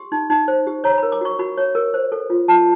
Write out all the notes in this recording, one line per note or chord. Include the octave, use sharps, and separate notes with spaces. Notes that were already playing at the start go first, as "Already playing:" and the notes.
Already playing: G4 C6
D#4
D#4
C5
G4
C#5 A#5
A#4 B5
D6
F#4 C#6
F#4 B5
C#5
A#4
C5
A4
F4
F4 A5